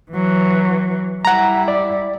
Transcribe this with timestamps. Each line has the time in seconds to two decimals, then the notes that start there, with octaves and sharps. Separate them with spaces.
0.11 E3 F#3
1.25 G3 E4 F#5 A#5
1.68 D5